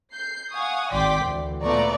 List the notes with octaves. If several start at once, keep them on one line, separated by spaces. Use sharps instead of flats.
G6 C7
F5 F#5 G#5 C#6 D#6
G#1 D5 G5 C6 D6 B6
D2 E3
A#2 A3 B3 D5 A#5 C#6